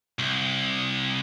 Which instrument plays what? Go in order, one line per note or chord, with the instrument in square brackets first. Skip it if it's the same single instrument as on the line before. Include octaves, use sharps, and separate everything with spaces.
[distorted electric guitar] C2